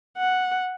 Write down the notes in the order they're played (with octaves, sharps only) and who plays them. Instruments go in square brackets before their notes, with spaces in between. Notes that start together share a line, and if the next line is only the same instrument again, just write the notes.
[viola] F#5